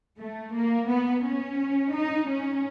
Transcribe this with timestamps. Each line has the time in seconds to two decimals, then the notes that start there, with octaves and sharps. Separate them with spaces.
0.19 A3
0.54 A#3
0.89 B3
1.24 C#4
1.93 D#4
2.28 C#4